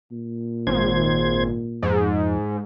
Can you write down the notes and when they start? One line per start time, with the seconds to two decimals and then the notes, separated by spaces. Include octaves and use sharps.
0.12 A#2
0.67 G#1 C5 G#6
1.83 F2 G#2